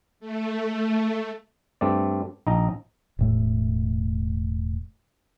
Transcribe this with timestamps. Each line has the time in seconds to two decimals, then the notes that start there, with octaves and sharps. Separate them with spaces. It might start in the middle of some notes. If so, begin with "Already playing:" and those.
0.20 A3
1.81 G2 A3 C4 D5
2.47 A#1 D#4 A#5
3.19 E1 A2 A3